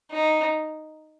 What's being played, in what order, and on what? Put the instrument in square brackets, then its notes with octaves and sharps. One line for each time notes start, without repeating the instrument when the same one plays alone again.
[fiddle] D#4